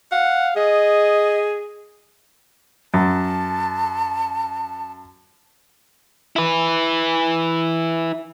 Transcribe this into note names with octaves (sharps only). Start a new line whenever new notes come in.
F5 F#5
G#4 D#5
F#2 A5
E4 B4